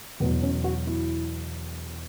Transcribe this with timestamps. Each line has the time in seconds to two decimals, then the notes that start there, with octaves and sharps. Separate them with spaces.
0.20 E2 B2 F#3 B3
0.42 C#4
0.64 F#4
0.87 E4